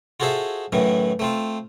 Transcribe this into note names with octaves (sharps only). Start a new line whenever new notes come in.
F4 F#4 G#4 A4 C5 E5
F#2 A2 D#3 E3
A3 C4 F4